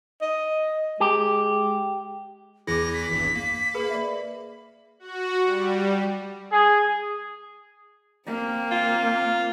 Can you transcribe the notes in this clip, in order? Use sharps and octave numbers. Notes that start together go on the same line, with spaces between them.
D#5
G#3 G4
E2 E3 E4 G#4 D6 A#6
B6
G#1 E2 G2
A#3
G#4 A#4 B4 B5
D5 E5
F#4
G3
G#4
A#3 C4
F4